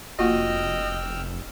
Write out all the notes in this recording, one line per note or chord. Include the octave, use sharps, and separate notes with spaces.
F1 A#3 F4 F#4 D#5 G5 E6 F6